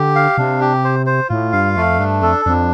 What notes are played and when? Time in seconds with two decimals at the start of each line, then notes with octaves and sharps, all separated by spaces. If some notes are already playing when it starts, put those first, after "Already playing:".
Already playing: D3 G4
0.15 F5
0.38 C3 D4
0.61 G4
0.84 C5
1.06 C5
1.29 A2 F4
1.52 G2 F5
1.76 F2 A3
1.99 G2 D4
2.22 F2 A4
2.45 F2 D4